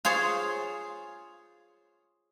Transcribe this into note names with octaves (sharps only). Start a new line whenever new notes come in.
F4 G#4 C5 C#5